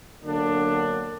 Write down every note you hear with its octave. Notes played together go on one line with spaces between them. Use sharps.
D3 F#3 A#3 B3 D4